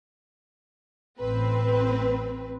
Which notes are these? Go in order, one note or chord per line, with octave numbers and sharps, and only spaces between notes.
A1 C4 B4